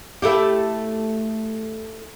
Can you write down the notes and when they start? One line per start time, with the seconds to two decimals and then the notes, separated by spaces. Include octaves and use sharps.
0.22 A3 E4 G4